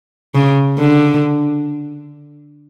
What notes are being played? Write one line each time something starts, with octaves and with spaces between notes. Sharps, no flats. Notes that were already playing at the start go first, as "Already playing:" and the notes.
C#3
D3